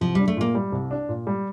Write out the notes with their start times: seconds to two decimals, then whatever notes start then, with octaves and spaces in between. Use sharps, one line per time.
0.01 C2 F3
0.15 G3 D4
0.28 A3
0.37 A#2 A#3
0.55 G3
0.72 C2
0.91 D4
1.09 A#2
1.27 G3